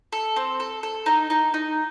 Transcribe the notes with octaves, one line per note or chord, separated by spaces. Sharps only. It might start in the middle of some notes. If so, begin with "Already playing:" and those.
A4
C4
A4
A4
D#4
D#4
D#4